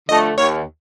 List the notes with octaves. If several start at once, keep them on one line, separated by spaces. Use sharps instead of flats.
D3 F3 A3 D#5
D#2 C#5